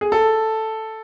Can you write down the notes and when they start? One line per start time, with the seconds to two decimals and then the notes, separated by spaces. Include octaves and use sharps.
0.01 G#4
0.12 A4